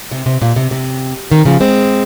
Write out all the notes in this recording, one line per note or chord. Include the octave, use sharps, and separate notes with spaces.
C3
C3
A#2
C3
C3
C3 D#3
C#3 F3
G#3 C4